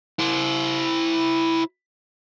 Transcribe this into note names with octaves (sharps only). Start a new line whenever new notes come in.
E4 C5